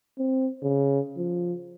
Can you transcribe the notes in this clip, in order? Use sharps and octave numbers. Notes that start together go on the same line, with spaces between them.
C4
C#3
F3